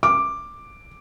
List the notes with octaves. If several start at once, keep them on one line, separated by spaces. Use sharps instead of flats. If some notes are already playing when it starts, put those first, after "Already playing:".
D6